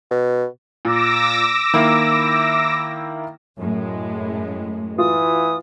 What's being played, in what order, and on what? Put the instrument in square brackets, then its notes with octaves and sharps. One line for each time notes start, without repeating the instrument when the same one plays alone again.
[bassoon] B2
[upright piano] A#2 [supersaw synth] D6 E6 A#6
[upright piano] D#3 A#3 E4
[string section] F#2 A2 G#3
[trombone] E3 [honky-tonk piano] F4 [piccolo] D#6